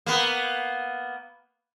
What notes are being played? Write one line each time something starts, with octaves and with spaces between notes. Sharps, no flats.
A#3 B3